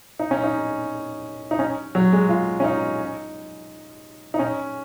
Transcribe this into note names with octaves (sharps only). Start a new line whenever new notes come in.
D#4
C#4
D#4
D#4
C#4
F#3
G#3
F4
C#4
D#4
D#4
C#4